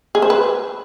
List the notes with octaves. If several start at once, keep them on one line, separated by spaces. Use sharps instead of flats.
G#4
C5
B4